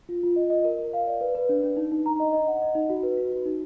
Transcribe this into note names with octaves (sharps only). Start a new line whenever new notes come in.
F4
F4
D#5
D#5
A#4
A#4
F5
D5
B4
B4
D4
D4
D#4
D#4
A#5
D#5
D#5
F#5
D#5
D#4
F#4
B4
F#4
F#4
D#4